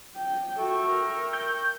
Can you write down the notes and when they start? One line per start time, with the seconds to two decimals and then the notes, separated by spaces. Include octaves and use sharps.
0.17 G5
0.58 F#4 A4 E5 G5 C#6
0.90 A#4
1.33 G6